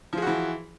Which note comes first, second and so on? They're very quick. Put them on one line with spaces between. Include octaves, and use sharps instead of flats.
F3 G#4 F#4 E3